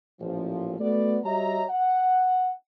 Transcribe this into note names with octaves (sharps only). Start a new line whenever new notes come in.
A1 A#2 F3
A3 B3 F#4 D5
G3 F#4 C#5 D#5 E5 A#5
F#5